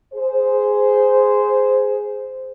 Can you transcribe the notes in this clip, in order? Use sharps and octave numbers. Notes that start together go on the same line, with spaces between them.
G#4 C5